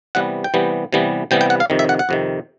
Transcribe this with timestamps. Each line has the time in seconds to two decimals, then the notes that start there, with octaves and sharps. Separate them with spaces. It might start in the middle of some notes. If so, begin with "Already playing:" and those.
0.15 C3 E3 G3 B3 F#5
0.44 G5
0.54 C3 E3 G3 B3
0.93 C3 E3 G3 B3
1.31 C3 E3 G3 B3 G5
1.41 G5
1.50 F#5
1.60 F5
1.70 F2 C3 D#3
1.79 E5
1.89 F#5
1.99 F#5
2.09 F2 C3 D#3